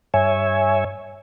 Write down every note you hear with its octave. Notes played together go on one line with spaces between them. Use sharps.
G2 C#5 E5 G#5